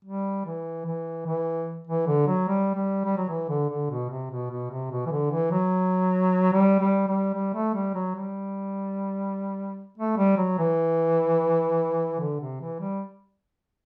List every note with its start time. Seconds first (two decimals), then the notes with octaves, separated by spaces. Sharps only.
0.05 G3
0.46 E3
0.86 E3
1.26 E3
1.87 E3
2.07 D3
2.27 F#3
2.48 G3
2.74 G3
3.05 G3
3.17 F#3
3.29 E3
3.49 D3
3.69 D3
3.90 B2
4.10 C3
4.31 B2
4.51 B2
4.70 C3
4.91 B2
5.06 E3
5.12 D3
5.32 E3
5.51 F#3
6.53 G3
6.80 G3
7.07 G3
7.34 G3
7.54 A3
7.74 G3
7.94 F#3
8.15 G3
9.98 A3
10.17 G3
10.37 F#3
10.58 E3
12.20 D3
12.41 C3
12.61 E3
12.81 G3